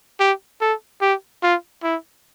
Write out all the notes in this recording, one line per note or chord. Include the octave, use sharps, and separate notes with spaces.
G4
A4
G4
F4
E4